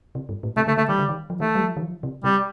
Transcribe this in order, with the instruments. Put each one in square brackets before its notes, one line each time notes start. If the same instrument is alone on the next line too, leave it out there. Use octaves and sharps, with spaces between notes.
[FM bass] C3
G2
A2
[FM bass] C3 [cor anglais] A3
[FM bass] D3 [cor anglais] A3
[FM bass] D3 [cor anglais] A3
[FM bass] D#3 [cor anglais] G3
[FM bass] D3
D#3
F3
[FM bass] D#3 [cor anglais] A3
[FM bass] G3
F3
D#3
F3
C3
[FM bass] C3 [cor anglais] G3